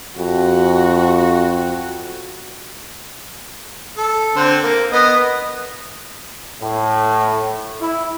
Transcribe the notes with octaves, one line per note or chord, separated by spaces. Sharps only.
F2 F#4
A4
D3 C4 C5
A#3
B3 D#5
A2
E4